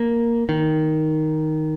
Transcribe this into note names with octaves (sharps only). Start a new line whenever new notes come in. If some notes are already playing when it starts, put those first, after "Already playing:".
Already playing: A#3
D#3